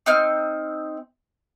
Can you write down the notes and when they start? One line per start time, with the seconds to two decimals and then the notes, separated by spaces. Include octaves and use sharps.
0.06 C4 D#4 F6